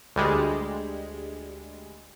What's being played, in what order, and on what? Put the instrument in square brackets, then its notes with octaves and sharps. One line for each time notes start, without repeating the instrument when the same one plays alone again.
[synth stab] D2 G3 G#3